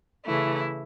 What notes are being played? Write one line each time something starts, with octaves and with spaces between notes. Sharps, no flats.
C#3 E3 A3 E4